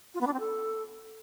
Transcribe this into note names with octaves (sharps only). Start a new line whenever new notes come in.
F4
B3
D4
C4
A4